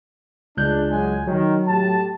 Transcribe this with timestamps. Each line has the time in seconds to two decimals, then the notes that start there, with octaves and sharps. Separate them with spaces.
0.57 C#2 G#3 D4 F#6 G6
0.91 F#3 G#3 G#5
1.27 D#3 F#3
1.68 A2 G4 A5